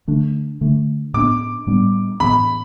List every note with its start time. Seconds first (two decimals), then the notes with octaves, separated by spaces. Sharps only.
0.08 D3 A3 D4
0.61 D3 A3 D4
1.14 A2 G3 B3 D4 D6
1.67 A2 G3 B3 D4
2.20 A2 E3 B3 B5